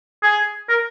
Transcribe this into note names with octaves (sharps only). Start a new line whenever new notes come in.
G#4
A#4